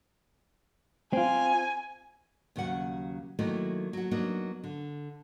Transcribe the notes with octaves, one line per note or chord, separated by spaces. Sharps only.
C4 F4 G#5
D#2 C#3 F#3 F#5
D#3 F#3 A3 A#3 D#4 E4
F#3 F#4
F#3 A#3 B3 D4 D#4
D3